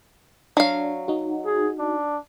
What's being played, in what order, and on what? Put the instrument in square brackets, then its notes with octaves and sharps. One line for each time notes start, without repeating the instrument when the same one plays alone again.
[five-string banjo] F#3 F5 [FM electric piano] D4
[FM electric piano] D#4 F#4
[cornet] G#4
D4